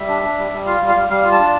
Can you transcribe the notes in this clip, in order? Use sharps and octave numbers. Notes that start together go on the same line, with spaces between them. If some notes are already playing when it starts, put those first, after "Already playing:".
Already playing: G3 E5
D4
D4
G3
G3
F4 F5
G3
F5
G3
G3 F5
F4
A5
D4